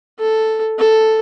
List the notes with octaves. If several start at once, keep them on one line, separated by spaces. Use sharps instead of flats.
A4
A4